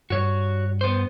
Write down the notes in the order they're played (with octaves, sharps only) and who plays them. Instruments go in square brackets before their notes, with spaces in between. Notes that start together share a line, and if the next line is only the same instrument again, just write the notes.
[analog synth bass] G2 [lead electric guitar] F#4 C#5
[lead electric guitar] B3 C5